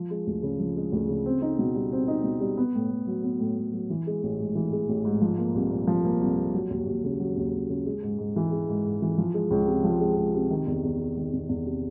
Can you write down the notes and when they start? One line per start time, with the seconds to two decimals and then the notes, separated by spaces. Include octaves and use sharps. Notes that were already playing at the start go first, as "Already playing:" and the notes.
Already playing: F3
0.11 G#3
0.27 D2
0.43 C#3
0.59 F3
0.77 G#3
0.92 D2
1.09 C#3
1.26 C4
1.42 D#4
1.59 B2
1.75 G3
1.92 C4
2.08 D#4
2.24 B2
2.41 G3
2.57 B3
2.75 A2
2.91 A2
3.07 F#3
3.23 B3
3.40 A2
3.57 A2
3.73 F#3
3.90 E3
4.07 G#3
4.23 A1
4.39 G#2
4.55 E3
4.72 G#3
4.89 A1
5.05 G#2
5.21 F3
5.38 A#3
5.55 C2
5.71 A#2
5.87 F3
6.05 A#3
6.21 C2
6.38 A#2
6.54 F#3
6.70 D#2
6.86 D#2
7.04 C#3
7.19 F#3
7.37 D#2
7.53 D#2
7.69 C#3
7.86 G#3
8.03 G#2
8.19 G#2
8.36 E3
8.52 G#3
8.69 G#2
8.85 G#2
9.02 E3
9.18 F3
9.34 G#3
9.51 C#2
9.67 C3
9.84 F3
10.01 G#3
10.17 C#2
10.34 C3
10.51 D#3
10.67 E2
10.84 E2
10.99 C3
11.17 D#3
11.33 E2
11.49 E2
11.66 C3